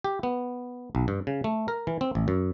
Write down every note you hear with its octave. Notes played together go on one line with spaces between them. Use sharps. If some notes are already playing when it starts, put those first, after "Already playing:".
G4
B3
B1
G2
C#3
A3
A#4
E3
C4
A1
F#2